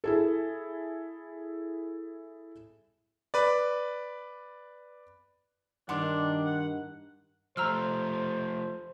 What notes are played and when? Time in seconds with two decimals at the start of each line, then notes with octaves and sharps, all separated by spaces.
0.04 E4 G#4 A4
3.34 B4 D5
5.89 G2 D#3 D4 F#5 C6 D6
6.45 F#5
7.57 F3 A3 C5 A#5 E6 F6